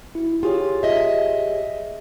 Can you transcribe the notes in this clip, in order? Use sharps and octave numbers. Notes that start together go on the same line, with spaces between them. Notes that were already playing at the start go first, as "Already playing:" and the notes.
E4 F#4
F4 G4 G#4 C#5
D#5 E5